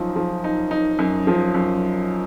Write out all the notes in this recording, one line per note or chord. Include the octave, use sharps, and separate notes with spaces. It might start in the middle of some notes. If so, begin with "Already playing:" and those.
Already playing: F#2 F3 D#4
F3
D#4
D#4
F#2
F3
F#2